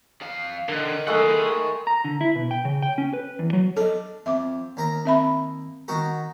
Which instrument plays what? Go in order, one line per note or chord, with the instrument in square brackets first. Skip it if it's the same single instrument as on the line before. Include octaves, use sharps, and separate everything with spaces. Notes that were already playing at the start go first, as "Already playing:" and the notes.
[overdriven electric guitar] F2 F5
[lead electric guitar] D3 [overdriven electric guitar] A#4 D#5
[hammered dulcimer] G#3 A3 B5 [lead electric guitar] G#4 F#5
[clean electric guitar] A#5
D3
E4
B2
G5
C#3
G5
C#4
B4
E2
F#3
[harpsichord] D4 [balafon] A4 D#5
[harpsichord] F2 [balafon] E5 D6
[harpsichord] D#2 A#4 A#5
[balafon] C4 E5 B5
[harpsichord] D#3 F#4 A#4